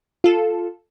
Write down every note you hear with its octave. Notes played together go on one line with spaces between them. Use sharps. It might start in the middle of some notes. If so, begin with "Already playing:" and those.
F4 A4